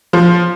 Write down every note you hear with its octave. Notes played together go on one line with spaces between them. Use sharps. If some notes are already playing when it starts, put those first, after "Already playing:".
F3